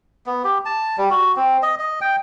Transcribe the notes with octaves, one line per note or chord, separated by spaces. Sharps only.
B3
G4
A5
G3
F#4
C4
D#5
D#5
G5